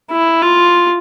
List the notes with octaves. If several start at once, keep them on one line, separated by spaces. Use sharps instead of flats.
E4
F4